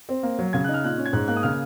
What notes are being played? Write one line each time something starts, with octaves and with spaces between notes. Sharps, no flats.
C4
A#3
F#3
C#3 G#6
D#4 F#6
F6
A#2 F#6
C#4
G#6
G#2 F#6
A#3 F#6
D#6
C#3 F6